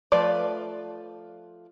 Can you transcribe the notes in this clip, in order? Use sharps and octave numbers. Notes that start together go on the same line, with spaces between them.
F3 A3 F4 B4 D5